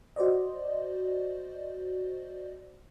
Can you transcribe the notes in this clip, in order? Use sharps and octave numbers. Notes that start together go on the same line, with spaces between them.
F#4 C5 D5 D#5